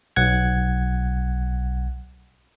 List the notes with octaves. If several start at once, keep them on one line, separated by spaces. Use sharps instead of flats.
B1 F#5 G#6